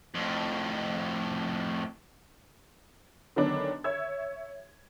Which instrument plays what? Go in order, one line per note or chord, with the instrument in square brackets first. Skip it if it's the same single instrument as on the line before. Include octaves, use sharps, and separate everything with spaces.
[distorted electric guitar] F2 A2
[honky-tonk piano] D3 D#3 F#3 B3 C#4 D4
C#5 E5 E6 G#6